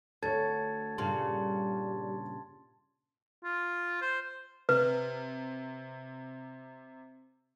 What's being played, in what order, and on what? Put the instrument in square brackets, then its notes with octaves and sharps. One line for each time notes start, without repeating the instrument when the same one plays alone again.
[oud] D2 [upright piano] A4 C#5 [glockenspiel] A5 G#6 A6
[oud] G2 A#2 C#3 [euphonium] G3 [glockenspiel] A5 C6
[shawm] F4
C5
[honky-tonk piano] C3 [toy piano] B4